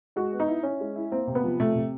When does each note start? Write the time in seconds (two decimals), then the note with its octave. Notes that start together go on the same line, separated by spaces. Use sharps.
0.16 G#3 F#4
0.32 B3
0.40 D#4
0.48 E4
0.63 C#4 E4
0.80 G#3
0.96 E4
1.11 A#3 C4
1.27 C3
1.35 B3
1.44 F3
1.60 C3 A3
1.75 C3